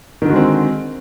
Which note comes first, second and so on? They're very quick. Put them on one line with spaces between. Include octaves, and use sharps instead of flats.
D#3 D3 F#4 G#3 C4